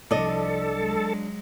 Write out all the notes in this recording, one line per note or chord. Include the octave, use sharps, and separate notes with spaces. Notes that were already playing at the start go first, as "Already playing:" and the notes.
C2 F3 D4 A4 D5 D#5
F#3 G#3